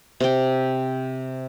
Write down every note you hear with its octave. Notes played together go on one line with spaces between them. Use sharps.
C3 G5